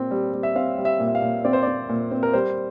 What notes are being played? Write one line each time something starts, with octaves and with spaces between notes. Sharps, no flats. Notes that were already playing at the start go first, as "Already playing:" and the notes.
Already playing: A#2 C4
G3
G3
E5
C4 F5
G3
E5
A#2
E5
F5
A#2
C4 D5
C5
C4 D5
A#2
C4
A#4
G3 C5